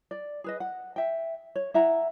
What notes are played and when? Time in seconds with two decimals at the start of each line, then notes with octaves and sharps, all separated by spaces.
0.11 D5
0.44 G#4 B4 D#5
0.60 F#5
0.96 E5 G5
1.55 C#5
1.74 E4 E5 F#5 A#5